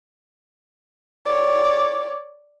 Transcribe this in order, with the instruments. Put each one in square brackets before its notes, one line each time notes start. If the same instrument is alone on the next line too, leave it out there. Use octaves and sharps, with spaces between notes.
[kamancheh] C#5 D5